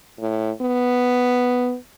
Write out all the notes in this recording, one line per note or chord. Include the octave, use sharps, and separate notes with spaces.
A2
B3